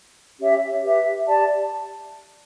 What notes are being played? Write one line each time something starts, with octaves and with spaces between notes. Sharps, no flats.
C#4 G4 C#5 E5
G4 B4 E5
G4 D5 A5